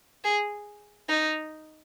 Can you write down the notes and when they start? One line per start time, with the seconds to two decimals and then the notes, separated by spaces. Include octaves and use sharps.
0.24 G#4
1.08 D#4